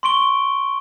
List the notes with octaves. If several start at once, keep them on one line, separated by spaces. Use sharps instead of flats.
C6 C#6 D7 G7